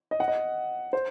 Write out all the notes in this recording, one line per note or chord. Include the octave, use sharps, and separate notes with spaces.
D#5
F#5
D#5
C5